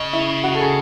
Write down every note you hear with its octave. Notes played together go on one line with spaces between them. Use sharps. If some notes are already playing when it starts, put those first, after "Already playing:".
Already playing: C#3 D#5
E4
F#4
A4
G#4